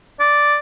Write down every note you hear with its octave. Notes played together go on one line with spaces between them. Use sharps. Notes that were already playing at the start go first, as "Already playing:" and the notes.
D5